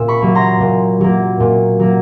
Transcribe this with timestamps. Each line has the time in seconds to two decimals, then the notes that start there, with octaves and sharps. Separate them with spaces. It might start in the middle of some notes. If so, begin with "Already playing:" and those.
Already playing: A#2 E6
0.08 B5 C#6
0.22 F#3 A#3
0.35 A#5 C6
0.61 A#2
1.01 F#3 A#3
1.40 A#2
1.79 F#3 A#3